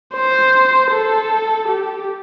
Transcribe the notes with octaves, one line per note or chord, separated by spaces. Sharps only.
C5
A4
G4